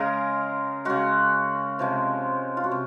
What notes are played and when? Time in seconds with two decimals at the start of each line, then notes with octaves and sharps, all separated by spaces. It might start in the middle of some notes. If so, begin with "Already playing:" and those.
Already playing: C#3 G#3 G#4 A#4
0.85 C#3 G#3 F#4
1.79 C3 F3 G#3
2.57 F4
2.64 F#4
2.71 C3